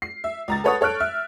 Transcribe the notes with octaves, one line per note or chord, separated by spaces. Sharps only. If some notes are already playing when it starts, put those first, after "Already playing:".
C7
E5
C#2 A#5 A6
A4 B4 C#5 F#5 D#6
A4 C#5 F6 F#6 D7
E5 F6